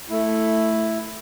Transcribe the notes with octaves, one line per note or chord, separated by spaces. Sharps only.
A3 E4